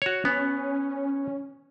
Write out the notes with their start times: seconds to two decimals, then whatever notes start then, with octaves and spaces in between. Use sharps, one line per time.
0.02 F#4 C#5
0.25 B3 C#4